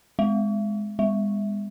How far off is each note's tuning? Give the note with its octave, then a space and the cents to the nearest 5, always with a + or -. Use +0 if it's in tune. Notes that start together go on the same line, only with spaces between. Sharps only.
G#3 +5
G#3 -35